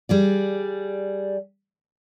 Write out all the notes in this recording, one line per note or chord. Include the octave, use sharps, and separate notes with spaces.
G3 G#4 D5